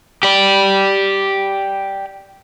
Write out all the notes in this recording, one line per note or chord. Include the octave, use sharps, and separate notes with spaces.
G4 D5